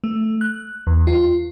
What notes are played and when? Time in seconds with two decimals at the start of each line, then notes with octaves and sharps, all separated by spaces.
0.04 A3
0.41 F#6
0.87 E2
1.07 F4